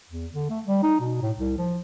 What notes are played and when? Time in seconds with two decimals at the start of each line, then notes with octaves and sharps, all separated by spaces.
0.09 E2
0.33 D3
0.50 A3
0.65 G3
0.83 D#4
1.00 B2
1.22 A2
1.37 C2
1.58 F3